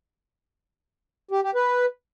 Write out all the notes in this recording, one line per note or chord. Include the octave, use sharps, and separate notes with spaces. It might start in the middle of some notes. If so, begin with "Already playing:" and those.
G4
G4
B4